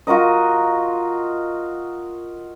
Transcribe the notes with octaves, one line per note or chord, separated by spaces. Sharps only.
F4 F#4 A#4 D#5